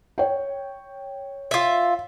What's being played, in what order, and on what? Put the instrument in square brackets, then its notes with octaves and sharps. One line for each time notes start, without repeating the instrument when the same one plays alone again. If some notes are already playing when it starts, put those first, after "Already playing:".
[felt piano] C#5 G5
[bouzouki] F4 E5